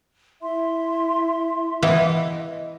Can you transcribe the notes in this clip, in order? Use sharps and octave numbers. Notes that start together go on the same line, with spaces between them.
E4 E5 C6
E3 B3 E4 D#5